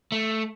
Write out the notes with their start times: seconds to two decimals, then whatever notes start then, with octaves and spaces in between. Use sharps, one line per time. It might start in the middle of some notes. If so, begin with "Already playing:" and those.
0.12 A3